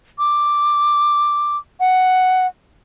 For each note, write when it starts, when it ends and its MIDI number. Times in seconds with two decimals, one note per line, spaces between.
0.19 1.57 86
1.80 2.47 78